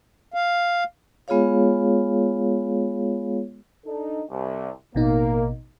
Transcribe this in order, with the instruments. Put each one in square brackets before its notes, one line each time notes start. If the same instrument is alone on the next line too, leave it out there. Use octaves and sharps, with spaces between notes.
[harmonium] F5
[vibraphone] G#3 B3 F4 G#4 C#5 F5
[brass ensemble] D4 D#4 A4
C2
[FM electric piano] A1 B2 D#4 [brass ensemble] A#3